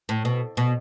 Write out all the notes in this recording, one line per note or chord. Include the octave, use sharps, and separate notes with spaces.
A2
B2
B2